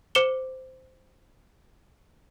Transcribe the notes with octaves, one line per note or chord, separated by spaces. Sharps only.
C5 D6 C#7 E7 G7